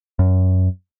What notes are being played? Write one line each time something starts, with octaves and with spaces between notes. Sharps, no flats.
F#2